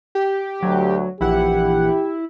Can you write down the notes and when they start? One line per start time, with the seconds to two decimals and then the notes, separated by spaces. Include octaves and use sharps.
0.15 G4
0.63 D2 F#3
1.21 A#1 E3 E4 G4 F#5